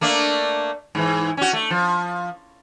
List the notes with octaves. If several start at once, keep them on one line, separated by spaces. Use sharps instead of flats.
A3 A#3 D4
G#2 E3
C#4 F#4
A3
F3